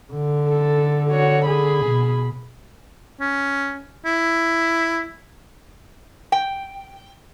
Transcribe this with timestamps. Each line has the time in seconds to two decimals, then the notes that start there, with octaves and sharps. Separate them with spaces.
0.13 D3
0.49 A4
1.10 F#4 C#5
1.45 G#4 B5
1.85 B2
3.20 C#4
4.05 E4
6.32 G5